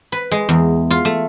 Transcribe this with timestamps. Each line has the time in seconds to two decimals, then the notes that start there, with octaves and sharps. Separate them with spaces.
0.12 B4
0.31 G#3
0.49 E2
0.91 F4
1.05 A3